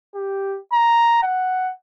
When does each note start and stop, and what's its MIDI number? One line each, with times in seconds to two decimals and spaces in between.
0.15 0.58 67
0.72 1.22 82
1.23 1.72 78